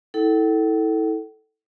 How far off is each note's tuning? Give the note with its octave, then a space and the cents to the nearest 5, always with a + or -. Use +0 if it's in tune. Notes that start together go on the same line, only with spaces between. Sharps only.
E4 -35 A4 +0 G5 -45